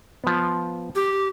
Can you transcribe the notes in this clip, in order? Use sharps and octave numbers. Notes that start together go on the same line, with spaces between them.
F3 B3
G4